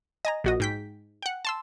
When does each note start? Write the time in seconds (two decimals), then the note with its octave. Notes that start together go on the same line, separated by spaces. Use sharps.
0.25 D#5 G#5 A#5
0.44 A#1 F#4 D#5
0.60 G#2 G5 B6
1.22 F#5 G5
1.45 A5 C6 E6